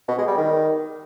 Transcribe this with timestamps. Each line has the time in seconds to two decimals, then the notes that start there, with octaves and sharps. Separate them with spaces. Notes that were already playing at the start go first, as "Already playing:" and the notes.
0.08 B2
0.18 G#3
0.28 G3
0.37 D#3